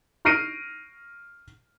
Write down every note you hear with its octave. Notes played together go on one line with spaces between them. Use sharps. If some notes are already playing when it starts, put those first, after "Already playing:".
C#6 F6 A#6 C7 D7 D#7